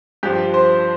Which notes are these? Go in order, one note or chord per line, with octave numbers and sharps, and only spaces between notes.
G2 F3 G4
C5